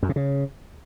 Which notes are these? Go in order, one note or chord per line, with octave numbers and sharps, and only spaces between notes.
F#2
C3
C#3